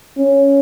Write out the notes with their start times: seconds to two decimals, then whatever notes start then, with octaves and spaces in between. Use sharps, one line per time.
0.18 C#4